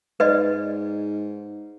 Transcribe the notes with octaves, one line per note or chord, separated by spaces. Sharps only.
G#2 B4 D5 D#5